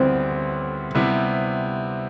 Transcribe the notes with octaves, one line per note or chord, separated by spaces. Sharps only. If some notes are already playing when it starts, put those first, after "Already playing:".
Already playing: D2 D3 G3 B3 C4 E4
C3 G3 B3 E4